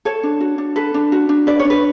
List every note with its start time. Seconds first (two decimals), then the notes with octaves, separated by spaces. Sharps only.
0.05 A4 C#5
0.23 D4
0.41 F#4
0.58 D4
0.76 A4 B4
0.94 D4
1.12 F#4
1.29 D4
1.47 B4 D5
1.60 C#5
1.65 D4
1.70 B4